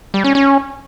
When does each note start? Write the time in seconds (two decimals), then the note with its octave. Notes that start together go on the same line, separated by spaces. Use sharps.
0.14 G3
0.24 C#4
0.35 C#4